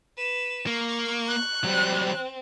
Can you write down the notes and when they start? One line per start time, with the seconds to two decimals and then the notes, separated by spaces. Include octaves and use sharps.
0.17 B4 E7
0.67 A#3 C#6
1.29 F#6
1.64 F#3 G3 C4